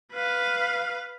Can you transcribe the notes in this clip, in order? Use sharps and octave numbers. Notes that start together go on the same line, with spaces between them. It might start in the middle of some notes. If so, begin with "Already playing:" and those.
B4 F5